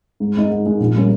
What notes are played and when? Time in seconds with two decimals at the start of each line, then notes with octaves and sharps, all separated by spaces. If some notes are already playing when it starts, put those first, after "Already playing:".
0.20 G#2
0.36 D#3 G#3 D#4
0.50 G#2
0.65 D#3 G#3 D#4
0.80 A#1
0.96 G3 A#3 C#4